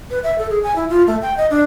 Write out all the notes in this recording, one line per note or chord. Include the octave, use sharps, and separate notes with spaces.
B4
E5
A4
G#4
G#5
E4
F4
A3
G5
D#5
D4